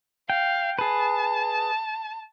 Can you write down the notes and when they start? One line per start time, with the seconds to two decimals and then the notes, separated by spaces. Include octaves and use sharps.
0.30 F5 G5
0.79 G#4 B4 A5